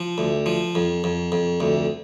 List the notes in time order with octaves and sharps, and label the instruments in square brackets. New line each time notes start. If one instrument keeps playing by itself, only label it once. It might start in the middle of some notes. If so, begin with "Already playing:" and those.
Already playing: [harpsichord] F3
D2
F3
F2
F2
F2
D2